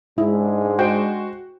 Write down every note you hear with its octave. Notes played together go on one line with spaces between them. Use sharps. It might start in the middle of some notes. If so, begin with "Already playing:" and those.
G#2 G#3 D4 E4 G#4
F#4 C5 G5